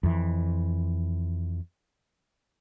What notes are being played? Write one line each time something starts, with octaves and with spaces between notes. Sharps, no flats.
F2 E3